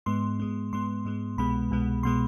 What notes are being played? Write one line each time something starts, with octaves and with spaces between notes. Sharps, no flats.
G#2 G#3 B3 C6
G#2 G#3 B3
G#2 G#3 B3 C6
G#2 G#3 B3
C2 B2 G#3 B3 B5
C2 B2 G#3 B3
B2 G#3 B3 C6